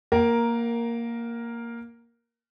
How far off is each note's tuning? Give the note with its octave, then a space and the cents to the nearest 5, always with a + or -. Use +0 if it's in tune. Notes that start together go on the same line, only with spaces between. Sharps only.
A#3 +0 A#4 +5 F#5 +40